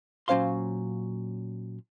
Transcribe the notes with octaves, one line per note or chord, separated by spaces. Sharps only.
A#2 F#3 C#4 C5 F5 C6